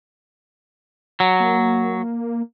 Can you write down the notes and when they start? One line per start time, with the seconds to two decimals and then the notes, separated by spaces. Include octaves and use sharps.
1.20 F#3
1.40 A#3